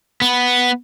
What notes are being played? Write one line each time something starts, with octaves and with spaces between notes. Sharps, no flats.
B3